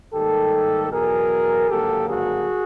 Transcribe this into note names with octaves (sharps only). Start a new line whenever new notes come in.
G#2 D#3 G3 A#3 G4 A4
E2 B2 F#3 G#4 A#4
G#1 G2 D3 F#3 A#3 G4 A4
F#4 G#4